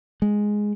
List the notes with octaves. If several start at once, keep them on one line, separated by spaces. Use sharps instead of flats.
G#3